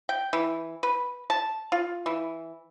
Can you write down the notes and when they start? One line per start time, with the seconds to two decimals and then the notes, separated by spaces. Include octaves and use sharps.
0.09 G5
0.33 E3
0.83 B4
1.30 A5
1.72 F4
2.06 E3